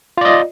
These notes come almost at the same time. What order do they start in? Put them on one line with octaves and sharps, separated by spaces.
F4 D5 D#5